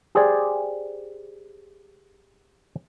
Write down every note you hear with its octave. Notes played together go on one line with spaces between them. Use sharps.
G4 G#4 C5 D5 G#5